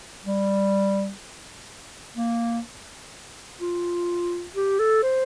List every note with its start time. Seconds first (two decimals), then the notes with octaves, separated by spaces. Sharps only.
0.25 G3
2.17 A#3
3.60 F4
4.55 G4
4.79 A4
5.03 C5